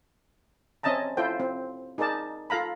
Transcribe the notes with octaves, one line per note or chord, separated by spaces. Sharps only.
C4 C#4 D#5 E5 A5 A#5
E4 F4 A4 C5 G5
C4
D#4 G#4 A#4 D5 A5
F4 A4 F5 A#5 B5